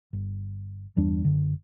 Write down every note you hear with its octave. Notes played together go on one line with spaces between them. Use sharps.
G1
G1 E2 G3 D4
F#1 D3